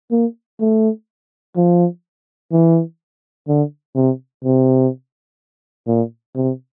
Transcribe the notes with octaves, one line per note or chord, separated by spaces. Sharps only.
A#3
A3
F3
E3
D3
C3
C3
A#2
C3